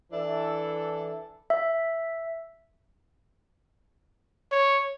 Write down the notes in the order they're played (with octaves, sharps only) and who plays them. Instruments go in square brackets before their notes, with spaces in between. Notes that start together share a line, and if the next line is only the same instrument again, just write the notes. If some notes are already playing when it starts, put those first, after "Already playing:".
[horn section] E3 D4 E4 A4
[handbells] E5
[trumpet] C#5